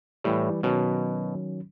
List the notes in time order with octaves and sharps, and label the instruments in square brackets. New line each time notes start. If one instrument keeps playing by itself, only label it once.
[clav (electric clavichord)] A2 [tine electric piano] E3 G3
[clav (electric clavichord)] B2 [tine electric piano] D#3 F#3 C#4